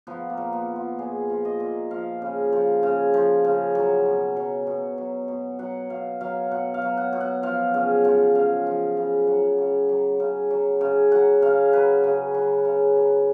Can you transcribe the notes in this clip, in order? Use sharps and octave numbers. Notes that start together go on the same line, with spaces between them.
F3 B3
A#3
A#2
B3
F3
F4
A#2 G#4
F3
D#5
A#2
F3 F5
C#3
F3
C#3
F3
C#3
F#3
B2
F#3
B2
F#3
B2
F#3 F#5
B2 F5
F#3 F5
B2 F#5
F5
F#3
F#5
B2
F#5
F3 F5
C#3
F3
C#3 F5
F3
C#3
F#3 F#5
C#3
F#3
C#3
F#3
C#3
F#3 F#5
C#3 F5
F#3 B4
C#3
F#3
C#3
F#3